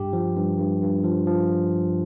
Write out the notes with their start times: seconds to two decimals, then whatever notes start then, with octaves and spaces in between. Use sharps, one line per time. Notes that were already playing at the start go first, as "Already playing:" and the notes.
Already playing: G2 G4
0.13 F3
0.36 G2
0.58 G2
0.82 G2
1.04 F3
1.27 F3